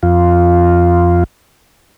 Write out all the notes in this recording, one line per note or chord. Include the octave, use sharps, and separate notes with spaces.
F2 F4